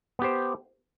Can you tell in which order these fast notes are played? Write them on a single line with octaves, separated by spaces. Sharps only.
B3 G4 C5